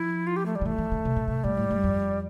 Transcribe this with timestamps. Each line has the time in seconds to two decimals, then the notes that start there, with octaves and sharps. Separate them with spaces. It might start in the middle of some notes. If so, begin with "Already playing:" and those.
Already playing: F3 E4
0.27 F4
0.36 G4
0.46 A3
0.55 G3
0.61 D3
0.65 E3 A3
0.78 E3
0.92 D3
1.05 C3
1.16 A#2
1.28 C3
1.44 A2 G3
1.57 A2
1.70 G2
1.84 F2